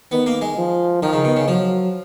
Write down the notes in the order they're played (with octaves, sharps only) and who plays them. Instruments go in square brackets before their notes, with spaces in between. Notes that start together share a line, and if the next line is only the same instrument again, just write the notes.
[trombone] D#3 [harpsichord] B3
[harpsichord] A#3
G#3
[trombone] F3
[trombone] D#3 [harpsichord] F3
[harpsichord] C#3
B2
C#3
[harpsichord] F3 [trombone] F#3